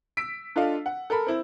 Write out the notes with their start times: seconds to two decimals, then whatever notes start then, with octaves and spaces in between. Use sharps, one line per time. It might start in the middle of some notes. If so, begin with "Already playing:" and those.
0.17 E6 B6 D7
0.56 D4 F4 A4 D#5 F5
0.86 F#5
1.10 A4 A#4 B5
1.26 C4 E4